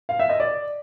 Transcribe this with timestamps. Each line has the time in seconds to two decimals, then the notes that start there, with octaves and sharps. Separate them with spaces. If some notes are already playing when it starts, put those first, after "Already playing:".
0.09 F5
0.19 E5
0.30 D#5
0.40 D5